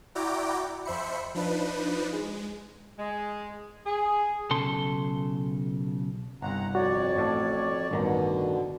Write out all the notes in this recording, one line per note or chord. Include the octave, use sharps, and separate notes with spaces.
E4 F#4 D5 G5 A#5 D6
F2 C5 E5 B5 C#7
F3 D4 D#4 B4
G#3
G#3
G#4
B1 C#3 A4 C6
G1 C2 F#5 A#5
F2 F#4 C#5 D5
A1 A2 A5
A1 G2 B2 D3 D#3 A#5